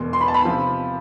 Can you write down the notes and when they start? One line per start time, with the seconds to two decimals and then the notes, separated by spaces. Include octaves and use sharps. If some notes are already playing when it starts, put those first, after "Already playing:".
Already playing: E1 E2 B2 C6
0.13 C6
0.21 B5
0.28 A5
0.34 B5
0.45 C3 F3